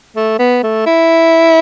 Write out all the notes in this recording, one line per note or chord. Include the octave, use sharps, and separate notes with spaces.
A3
B3
A3
E4